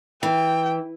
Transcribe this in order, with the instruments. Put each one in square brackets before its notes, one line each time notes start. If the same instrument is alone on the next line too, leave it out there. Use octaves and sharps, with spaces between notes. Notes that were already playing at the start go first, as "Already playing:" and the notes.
[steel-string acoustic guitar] E3 [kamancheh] G5